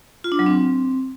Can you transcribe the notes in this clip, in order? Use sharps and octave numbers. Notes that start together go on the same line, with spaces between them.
F4
D4
F#3
C4